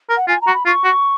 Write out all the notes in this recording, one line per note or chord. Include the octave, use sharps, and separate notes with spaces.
A#4
F#5
F4 G#5
A#5
F#4
B5
F4 C#6
F#4